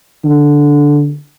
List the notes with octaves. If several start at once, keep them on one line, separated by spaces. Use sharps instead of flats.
D3